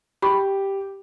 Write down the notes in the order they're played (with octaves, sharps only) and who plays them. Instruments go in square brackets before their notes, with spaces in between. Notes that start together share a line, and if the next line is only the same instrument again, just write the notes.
[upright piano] G4 [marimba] B5 C#6